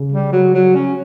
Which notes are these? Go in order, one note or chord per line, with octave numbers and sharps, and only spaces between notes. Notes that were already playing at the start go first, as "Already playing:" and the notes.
Already playing: C#3
G3
F#3
F#3
C#4